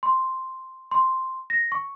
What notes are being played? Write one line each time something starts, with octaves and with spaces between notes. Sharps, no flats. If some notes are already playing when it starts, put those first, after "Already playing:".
C6
C6
A#6
C#6